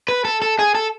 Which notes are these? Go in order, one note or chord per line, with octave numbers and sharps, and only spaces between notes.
B4
A4
A4
G#4
A4